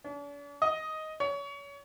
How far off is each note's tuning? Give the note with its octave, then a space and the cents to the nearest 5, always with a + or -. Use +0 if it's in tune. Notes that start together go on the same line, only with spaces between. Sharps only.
D4 -45
D#5 +10
C#5 +30